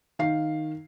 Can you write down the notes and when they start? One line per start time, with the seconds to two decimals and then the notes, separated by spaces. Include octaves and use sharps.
0.19 D#3 F5 C7